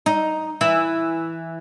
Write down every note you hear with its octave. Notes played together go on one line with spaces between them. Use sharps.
D#4
E3 E4